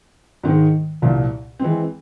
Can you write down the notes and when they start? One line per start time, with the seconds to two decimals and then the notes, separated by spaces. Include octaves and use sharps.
0.43 G#2 D#3 G#3
1.02 C2 A#2 F3
1.59 E3 G#3 C4